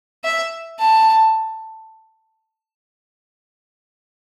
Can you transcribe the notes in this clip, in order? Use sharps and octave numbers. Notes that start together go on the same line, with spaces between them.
E5
A5